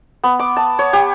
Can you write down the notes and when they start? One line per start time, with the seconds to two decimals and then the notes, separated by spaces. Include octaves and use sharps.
0.24 B3
0.39 D6
0.56 A5
0.79 C#5
0.93 G4